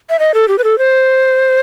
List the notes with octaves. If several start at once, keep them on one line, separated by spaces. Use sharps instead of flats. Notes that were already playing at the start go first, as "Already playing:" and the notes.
E5
D#5
A4
G4
B4
A4
C5